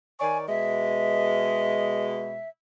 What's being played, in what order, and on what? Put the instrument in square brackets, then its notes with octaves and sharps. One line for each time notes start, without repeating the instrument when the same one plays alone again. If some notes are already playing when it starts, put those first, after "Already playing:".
[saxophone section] D#3 C#5 D5 [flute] G#5
[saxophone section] B2 G#3 [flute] E5